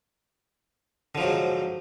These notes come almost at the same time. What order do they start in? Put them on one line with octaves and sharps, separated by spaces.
D3 F3 F#3 G#2